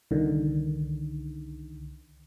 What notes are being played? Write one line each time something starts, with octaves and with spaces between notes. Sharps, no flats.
C2 D3 D#3